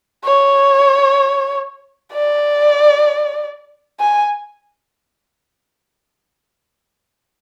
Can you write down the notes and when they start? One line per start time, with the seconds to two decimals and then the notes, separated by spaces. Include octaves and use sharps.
0.24 C#5
2.12 D5
4.00 G#5